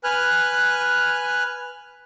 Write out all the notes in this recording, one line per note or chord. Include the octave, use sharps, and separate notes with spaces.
B4 G#5 F6 F#6